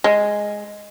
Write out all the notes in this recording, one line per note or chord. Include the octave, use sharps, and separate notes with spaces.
G#3